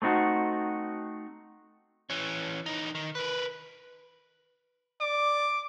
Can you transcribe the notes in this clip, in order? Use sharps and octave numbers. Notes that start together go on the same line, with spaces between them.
A3 C4 D#4 F#4
E3 C#4
E3 D#4
D#3
A#4 B4
D5 D6